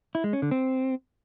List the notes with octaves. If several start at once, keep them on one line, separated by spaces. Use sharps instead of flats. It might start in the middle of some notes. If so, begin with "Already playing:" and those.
E4
G#3
C#4
D3
C4